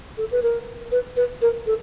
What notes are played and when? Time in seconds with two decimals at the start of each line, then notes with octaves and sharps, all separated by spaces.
0.18 A4
0.32 B4
0.43 A#4
0.92 B4
1.17 B4
1.42 A#4
1.67 A4